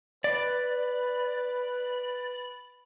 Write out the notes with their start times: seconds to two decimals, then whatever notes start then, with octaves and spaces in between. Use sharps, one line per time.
0.24 B4 D5